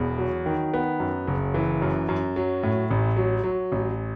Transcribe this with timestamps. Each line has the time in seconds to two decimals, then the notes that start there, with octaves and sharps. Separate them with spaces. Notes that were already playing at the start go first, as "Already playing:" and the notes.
Already playing: E1 E2
0.18 F#3
0.46 D#3
0.73 B3
1.00 F#2
1.28 F#1
1.54 E3
1.82 F#2
2.09 F#2
2.36 F#3
2.63 A2
2.90 A1
3.17 F#3
3.43 F#3
3.72 A1